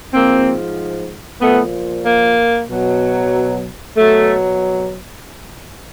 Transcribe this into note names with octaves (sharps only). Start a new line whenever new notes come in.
G#2 F3 A#3 C4
A#2 F3 A3 B3
A#3
B2 F#3
B2 F#3 A3